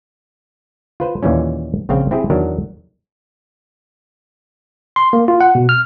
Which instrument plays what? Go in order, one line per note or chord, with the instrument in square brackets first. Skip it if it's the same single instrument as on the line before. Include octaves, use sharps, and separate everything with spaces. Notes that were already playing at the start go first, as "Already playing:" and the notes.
[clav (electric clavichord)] F4 B4 C5
D#2 A#2 E3 G3 C#4
A#1 C#3 C4 F5 G5
C4 E4 G4 G#4
E2 D#3 F#3 D4 A#4
[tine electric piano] C6
A#3
F4
F#5
B2
F6